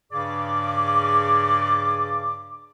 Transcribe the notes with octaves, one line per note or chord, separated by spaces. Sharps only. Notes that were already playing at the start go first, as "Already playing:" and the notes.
G2 C#3 G#4 D5 D6